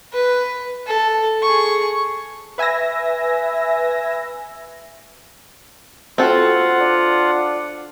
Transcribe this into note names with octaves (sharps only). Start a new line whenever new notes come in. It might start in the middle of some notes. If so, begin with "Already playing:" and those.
B4
A4
G#4 C#6
B4 E5 G#5 E6 A#6
C4 F4 F#4 A4 F#5
D4